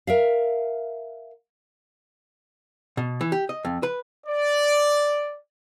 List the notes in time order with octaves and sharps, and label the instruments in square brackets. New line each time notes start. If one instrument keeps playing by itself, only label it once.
[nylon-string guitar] A#4 E5 F5
[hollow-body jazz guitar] B2
E3
G4
D#5
F2
B4
[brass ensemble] D5